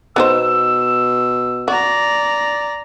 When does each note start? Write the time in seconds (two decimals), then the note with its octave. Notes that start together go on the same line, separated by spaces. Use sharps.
0.16 B2 B3 D#4 C5 E6
1.68 F#4 D5 A#5